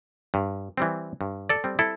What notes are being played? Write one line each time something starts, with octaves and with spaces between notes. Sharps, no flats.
G2
E3 G3 C4
G2
A4 D5
G3 C4
E4 A4